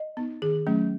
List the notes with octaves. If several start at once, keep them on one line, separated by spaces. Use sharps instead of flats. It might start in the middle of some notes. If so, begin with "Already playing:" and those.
Already playing: D#5
B3 D#4
D#3 G#4
F#3 A3 C#4